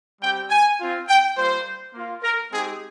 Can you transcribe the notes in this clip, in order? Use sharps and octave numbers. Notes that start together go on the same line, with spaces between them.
G3 C4 G4 G5
G#5
C4 F4
G5
G3 A#3 F4 C5
A#3 F4
A#4
G#3 C4 D#4 G4 G#4